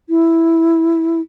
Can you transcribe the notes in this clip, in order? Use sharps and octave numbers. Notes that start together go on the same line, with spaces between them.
E4